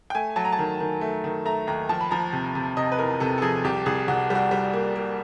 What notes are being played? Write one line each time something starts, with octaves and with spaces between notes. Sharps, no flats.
G5
A3 G#5
F#3 A5
A#5
A5
D#3
D#3
A3
D#3
A3 A#5
D#2 A#5
F3 A5
B5
F3 A#5
C3
C3
C3 D#5
B4
E2 A#4
C3 A4
A4
F3 G#4
C2 G4
C2 G#4
C2 F#4
G3 F#4
G3
A#3
A#3